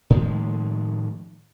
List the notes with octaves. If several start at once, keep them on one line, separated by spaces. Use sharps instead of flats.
A2 D#3 F3 G#3